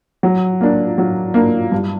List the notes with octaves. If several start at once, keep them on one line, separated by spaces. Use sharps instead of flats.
F#3
A#3 D4
F#3
A#3 D4
G2